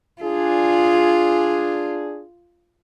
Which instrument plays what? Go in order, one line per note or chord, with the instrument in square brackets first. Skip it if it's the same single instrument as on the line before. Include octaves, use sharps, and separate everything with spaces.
[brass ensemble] D4 G#4 [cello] F4